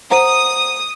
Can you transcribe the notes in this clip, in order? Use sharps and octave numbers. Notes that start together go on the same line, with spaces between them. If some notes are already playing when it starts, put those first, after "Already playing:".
C5 F#5 A#5 D#6